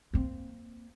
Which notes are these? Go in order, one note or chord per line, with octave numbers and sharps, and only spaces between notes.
A#3 C4